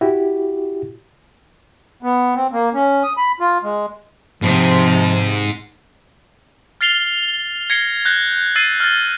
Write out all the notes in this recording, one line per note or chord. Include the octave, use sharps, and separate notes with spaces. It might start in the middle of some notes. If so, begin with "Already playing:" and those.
E4 F#4 G4
B3
C4
A#3
C#4
D#6
B5
F4
G#3
G#2 C3 F3
F6 A6 C7 F7 G7
G#6 A#6 C7 C#7 G7
F#6 G6 A#6
E6 A6 C7 D#7
F6 A6